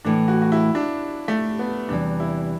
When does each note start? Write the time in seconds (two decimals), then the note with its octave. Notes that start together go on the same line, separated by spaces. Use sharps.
0.05 A2 E3 A3 D4
0.28 F#4
0.42 F#4
0.52 E4
0.75 D4
1.28 A3
1.59 B3
1.89 E2 C3 E3 G3 D4
2.20 E4